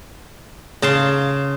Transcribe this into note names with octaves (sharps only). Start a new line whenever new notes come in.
C#3 A5 C6